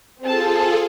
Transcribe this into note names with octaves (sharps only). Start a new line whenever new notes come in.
C4 F4 G#4 A4 A5